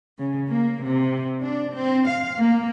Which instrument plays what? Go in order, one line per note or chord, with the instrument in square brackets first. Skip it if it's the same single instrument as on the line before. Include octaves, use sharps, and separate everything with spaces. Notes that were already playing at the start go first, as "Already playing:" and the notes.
[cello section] C#3
A#3
C3
D4
C4
F5
A#3